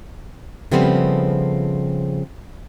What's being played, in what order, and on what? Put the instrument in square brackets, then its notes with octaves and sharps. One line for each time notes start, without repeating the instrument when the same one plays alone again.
[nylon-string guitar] C#3 F3 G3 A3 B3 C4